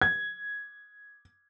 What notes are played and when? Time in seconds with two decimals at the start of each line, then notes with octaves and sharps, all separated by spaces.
0.02 G#6